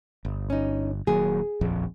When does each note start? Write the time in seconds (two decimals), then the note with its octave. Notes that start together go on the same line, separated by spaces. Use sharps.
0.25 G1
0.50 C#4 D#4
1.07 D#1 D#2 F#3 G#4
1.61 D#1 A#1 F2